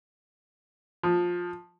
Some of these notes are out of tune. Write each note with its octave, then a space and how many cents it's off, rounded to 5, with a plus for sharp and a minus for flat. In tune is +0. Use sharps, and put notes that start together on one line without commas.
F3 +15